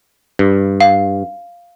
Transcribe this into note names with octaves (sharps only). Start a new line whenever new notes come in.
G2
F5